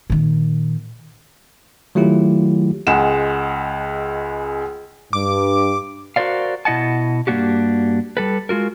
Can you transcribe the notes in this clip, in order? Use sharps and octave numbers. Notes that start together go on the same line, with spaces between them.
A#2 D#3
D#3 F#3 A3 E4 F4 G4
C#2 G#3 F#5 E7
G2 D6
F#4 A#4 C5 D5 F5
B2 E4 D#5 F#5 A5
G2 F3 A#3 D4 F#4 G4
G3 A4 B4
G#3 F4 F#4 A#4